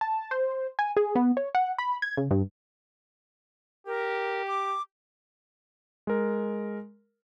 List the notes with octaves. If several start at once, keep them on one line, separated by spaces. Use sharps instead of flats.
A5
C5
G#5
G#4
B3
C#5
F#5
B5
G#6
C#3
G2
G4 A#4
D6
G#3 A#4